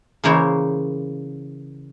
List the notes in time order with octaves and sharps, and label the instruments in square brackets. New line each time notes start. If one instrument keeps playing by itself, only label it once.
[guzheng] C#3 E3 A#3 E4 C5 C#5